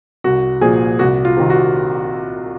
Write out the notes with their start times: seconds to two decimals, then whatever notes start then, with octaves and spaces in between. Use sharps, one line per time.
0.24 C2 F#4
0.61 A#2 F3 G#4
0.99 C2 F#4
1.25 F4
1.37 C3 D#3
1.50 F#4